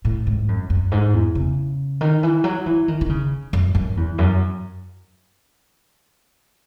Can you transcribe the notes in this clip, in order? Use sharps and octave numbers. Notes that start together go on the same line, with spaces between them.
A2
G#2
F#2
F#2
G#2
E2
C#3
D#3
E3
F#3
E3
D#3
D#3
C#3
F#2
F#2
E2
F#2